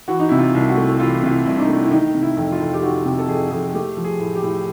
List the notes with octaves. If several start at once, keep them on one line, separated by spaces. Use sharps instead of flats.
E3 F#4
D#4
C3 E4
F4
C2
F#4
A3
E3 F4
C3 F4
E4
C2
D4
D#4
A3
E4
D#3 D#4
C3
E4
F2
F4
F2
G4
D#3 F#4
C3 G4
A4
F2 G#4
F2 G#4
A3 G4
F3
G#4
A2
G4
A2